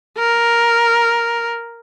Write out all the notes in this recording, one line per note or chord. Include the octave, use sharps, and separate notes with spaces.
A#4